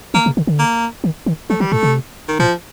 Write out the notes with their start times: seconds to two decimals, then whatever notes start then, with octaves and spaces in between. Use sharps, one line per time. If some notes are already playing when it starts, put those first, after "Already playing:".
0.14 D#3 A#3
0.26 C3
0.37 D3
0.47 D3
0.59 A#3
1.04 D#3
1.26 D#3
1.50 F3 A3
1.60 D#3 G3
1.72 A2 A3
1.83 C3
2.28 D#3
2.39 A#2 F3